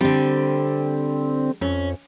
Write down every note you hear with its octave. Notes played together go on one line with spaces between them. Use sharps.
D3 G3 C4
F2 C#4